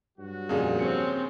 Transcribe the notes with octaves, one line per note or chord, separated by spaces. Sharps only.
G2 F#3 F#4
F2 A#2 C#3 A#3 G#4
C4 C#5 C#7